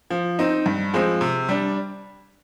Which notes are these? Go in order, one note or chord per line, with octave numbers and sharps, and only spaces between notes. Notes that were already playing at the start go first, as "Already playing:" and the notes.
F3
C4 D#4
G2
F3 G#3 C4
C3
G3 D4